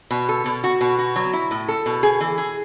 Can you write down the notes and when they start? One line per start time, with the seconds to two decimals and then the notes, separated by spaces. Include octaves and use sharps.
0.11 B2
0.29 A4
0.46 B2
0.64 F#4
0.81 B2
0.99 F#4
1.16 F#3
1.33 E4
1.51 A2
1.69 A4
1.86 B2
2.03 G#4
2.21 E3
2.38 G#4